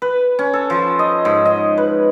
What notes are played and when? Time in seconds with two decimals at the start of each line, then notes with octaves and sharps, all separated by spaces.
0.02 B4
0.39 C#4
0.54 A4
0.70 F3
0.99 D#5
1.25 G#2
1.45 D#5
1.78 B4